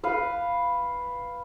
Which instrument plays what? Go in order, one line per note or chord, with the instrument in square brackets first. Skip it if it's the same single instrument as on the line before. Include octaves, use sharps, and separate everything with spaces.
[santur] B4 F5